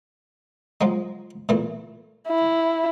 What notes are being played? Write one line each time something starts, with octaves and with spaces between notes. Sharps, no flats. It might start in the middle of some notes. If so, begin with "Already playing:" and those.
F3 F#3 G#3
A#2 E3 A3
E4